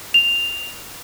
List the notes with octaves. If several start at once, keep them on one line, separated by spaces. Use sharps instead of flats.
F7